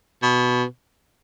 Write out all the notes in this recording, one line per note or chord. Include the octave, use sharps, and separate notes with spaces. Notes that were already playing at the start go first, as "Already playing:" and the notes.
B2